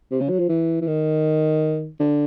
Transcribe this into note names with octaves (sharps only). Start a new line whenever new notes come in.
C3
C#3
F#3
F3
E3
E3
D#3
D3